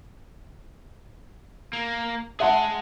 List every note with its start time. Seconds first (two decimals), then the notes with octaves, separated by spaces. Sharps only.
1.73 A#3
2.40 G#4 E5 F#5 A5 C6